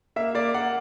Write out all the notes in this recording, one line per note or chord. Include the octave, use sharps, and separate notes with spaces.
A#3 E5
A#3 D5
A#3 F#5